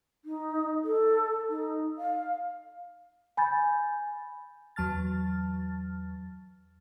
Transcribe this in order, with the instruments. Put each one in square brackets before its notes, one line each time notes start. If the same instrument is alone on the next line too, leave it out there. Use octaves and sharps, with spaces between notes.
[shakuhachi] D#4
A4
D#4
F5
[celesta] G#5 B5 G6 A6
[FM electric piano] E2 F#3 A5 F6 A6